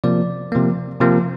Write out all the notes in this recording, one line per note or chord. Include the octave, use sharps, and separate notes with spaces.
C3 F3 A#3 D5
C3 F3 A#3
C3 F3 A#3